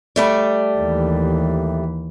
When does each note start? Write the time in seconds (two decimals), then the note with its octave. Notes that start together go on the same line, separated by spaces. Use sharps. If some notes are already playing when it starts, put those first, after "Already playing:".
0.16 G3 A3 D5
0.79 D#2 E3